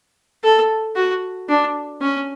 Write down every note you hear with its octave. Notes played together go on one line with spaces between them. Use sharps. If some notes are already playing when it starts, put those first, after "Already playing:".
A4
F#4
D4
C#4